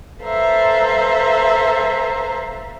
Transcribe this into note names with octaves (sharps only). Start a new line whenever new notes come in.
A4 B4 C5 E5 F5 A#5